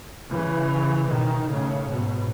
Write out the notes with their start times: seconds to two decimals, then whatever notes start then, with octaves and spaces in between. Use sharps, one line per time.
0.29 C#3 E3
1.07 B2 D#3
1.47 A2 C#3
1.87 G#2 B2